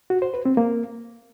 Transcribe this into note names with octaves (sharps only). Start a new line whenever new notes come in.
F#4
C5
B4
C4
A#3